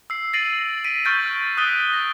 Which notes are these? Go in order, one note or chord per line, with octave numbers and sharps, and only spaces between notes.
E6 C7
A6 A#6 C7 D7 D#7 F#7
B6 D7 D#7
C#6 F6 G6 A6 A#6 D7
D#6 F#6 A6 B6 D#7 G7
A#6